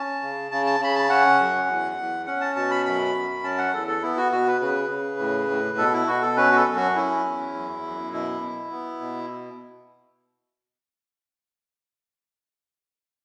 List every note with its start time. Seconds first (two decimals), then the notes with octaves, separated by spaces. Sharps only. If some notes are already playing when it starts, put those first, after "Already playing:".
Already playing: C#4 A5
0.22 C#3
0.51 C#3 A5
0.66 A5
0.80 C#3 B5
0.95 A5
1.09 C#4 F#5
1.39 F#2
1.68 E2
1.98 E2
2.26 C#4 F#5
2.41 A5
2.56 B2 A5
2.71 B5
2.86 F#2 B5
3.15 F#2
3.43 C#4 A5
3.58 F#5
3.73 E2 A4
3.88 A4
4.02 B3 E4
4.17 F#4
4.32 B2 F#4
4.47 B4
4.60 C#3 B4
4.90 C#3
5.19 A2
5.49 A2
5.78 B2 A4
5.93 E4
6.07 B2 F#4
6.22 A4
6.37 C#4 B4
6.52 F#4
6.56 A4
6.66 F#2
6.76 F#4
6.95 C#4 E4
7.25 E2
7.54 F#2
7.83 F#2
8.12 B2 E4
8.41 B2
8.71 B3
9.01 B2